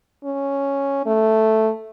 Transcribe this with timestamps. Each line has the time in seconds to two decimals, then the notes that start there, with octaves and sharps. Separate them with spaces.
0.25 C#4
1.06 A3